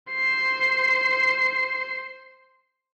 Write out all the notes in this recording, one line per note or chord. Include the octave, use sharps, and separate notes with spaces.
C5 C7